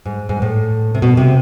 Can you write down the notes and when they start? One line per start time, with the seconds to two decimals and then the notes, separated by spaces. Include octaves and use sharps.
0.06 G#2
0.29 G#2
0.42 A2
0.95 C3
1.02 B2
1.17 C3